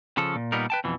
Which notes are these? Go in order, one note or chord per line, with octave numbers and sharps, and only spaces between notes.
C#3 F3 A4
A#2
A#2 G3 B3 D#4 A#4
B4 G5 A5
F2 B2 E3